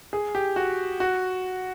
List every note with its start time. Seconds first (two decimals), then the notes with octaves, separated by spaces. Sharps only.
0.13 G#4
0.35 G4
0.56 F#4
1.00 F#4